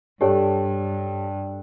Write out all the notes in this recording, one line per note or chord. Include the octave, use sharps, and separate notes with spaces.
G2 D4 G4 A4 C#5 G5